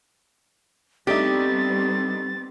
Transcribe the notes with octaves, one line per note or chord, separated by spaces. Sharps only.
G3 A3 B3 C4 D4 D#4 G4 A6